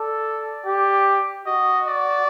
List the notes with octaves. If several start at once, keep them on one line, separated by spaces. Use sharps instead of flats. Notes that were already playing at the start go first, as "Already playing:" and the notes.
Already playing: A4 D5
G4
F#4 D#5
D5